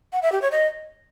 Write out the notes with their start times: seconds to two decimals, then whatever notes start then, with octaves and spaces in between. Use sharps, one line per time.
0.13 F#5
0.22 E5
0.32 G4
0.42 C#5
0.52 D#5